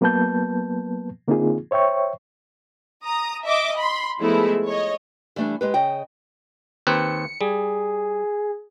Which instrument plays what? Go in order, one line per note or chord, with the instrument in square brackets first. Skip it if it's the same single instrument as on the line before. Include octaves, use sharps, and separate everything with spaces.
[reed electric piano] F#3 A#3 B3 B4 A5 G6
D3 A#3 C4 D#4 F4 G#4
C5 C#5 E5 G5 C#6
[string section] A#5 D#6
D#5 E5 D6
B5 C6
F3 G#3 A3 B3 E4
C#5 D#5
[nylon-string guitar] E3 G3 A3 C#4 D4
G#3 G4 B4
C#3 D#5 G5
[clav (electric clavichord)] D#2 C4 B4 [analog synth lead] C#7
[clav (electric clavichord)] G3 [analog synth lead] G#4